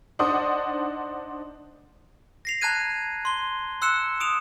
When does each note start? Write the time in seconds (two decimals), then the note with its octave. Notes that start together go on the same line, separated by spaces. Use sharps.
0.19 D4 D#4 C5 F#5 D#6
2.45 A#6 C7 F7
2.61 A5 A#5 F#6 G#6 D#7
3.25 C6 G7
3.82 C6 E6 F#6 C#7 E7
4.20 D#6 D7 E7 F7